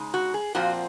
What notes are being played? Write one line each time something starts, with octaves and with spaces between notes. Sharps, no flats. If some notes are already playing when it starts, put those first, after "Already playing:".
Already playing: C#3 G#3 D#4
F#4
G#4
A#2 F3 C4 F4 F#4